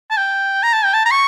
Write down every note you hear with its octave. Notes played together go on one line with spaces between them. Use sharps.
A5
G5
A#5
A5
G5
A5
A#5
C#6